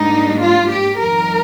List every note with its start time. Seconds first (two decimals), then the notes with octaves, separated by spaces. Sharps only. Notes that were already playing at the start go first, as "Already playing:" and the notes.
Already playing: G#2 G3 A#3 D4 D#4
0.42 F4
0.70 G4
0.98 F2 D#3 G3 A#4